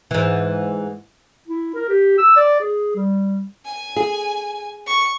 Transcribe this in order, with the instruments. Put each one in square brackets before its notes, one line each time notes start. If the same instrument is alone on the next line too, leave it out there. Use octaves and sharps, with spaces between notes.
[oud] G#2 E3
[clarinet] E4
A#4
G4
E6
D5
G#4
G3
[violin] G#5
[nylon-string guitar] G#4
[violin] C#6